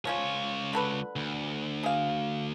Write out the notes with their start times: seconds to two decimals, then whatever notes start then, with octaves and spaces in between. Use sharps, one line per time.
0.05 C#2 F3 C#4 F4 C#5
0.73 D3 A4 B4
1.16 D2
1.83 G#4 F5